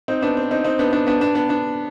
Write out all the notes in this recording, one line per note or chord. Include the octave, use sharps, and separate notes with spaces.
C4 D#4
B3 D4
C4
C4 D#4
C4 D#4
B3 D4
B3 D4
B3 D4
B3 D4
B3 D4
B3 D4